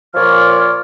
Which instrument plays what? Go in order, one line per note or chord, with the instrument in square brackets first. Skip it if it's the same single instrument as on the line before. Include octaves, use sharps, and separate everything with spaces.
[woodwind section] A#2 F3 F4 C#5 D5 F6